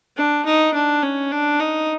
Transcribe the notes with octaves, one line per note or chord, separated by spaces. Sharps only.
D4
D#4
D4
C#4
D4
D#4